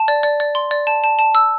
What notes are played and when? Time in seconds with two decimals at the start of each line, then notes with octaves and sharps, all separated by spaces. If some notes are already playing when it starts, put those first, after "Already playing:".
Already playing: A5
0.08 D5
0.23 D5
0.40 D5
0.55 C6
0.71 D5
0.87 A5
1.04 A5
1.19 A5
1.35 E6